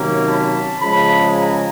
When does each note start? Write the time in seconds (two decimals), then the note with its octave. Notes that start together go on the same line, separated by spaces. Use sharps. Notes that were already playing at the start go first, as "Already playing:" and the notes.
Already playing: C3 D#3 F#3 A#3 C#4
0.26 A5 B5
0.80 C#3 F3 G#3 A5 B5
1.35 G#5 A#5